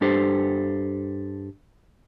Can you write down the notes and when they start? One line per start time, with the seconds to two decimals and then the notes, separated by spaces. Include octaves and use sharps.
0.01 G2 D4 G4 A4 C5